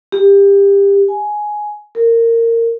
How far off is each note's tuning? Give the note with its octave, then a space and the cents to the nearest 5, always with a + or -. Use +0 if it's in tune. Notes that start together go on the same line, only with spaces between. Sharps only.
G4 +25
G#5 +10
A#4 -20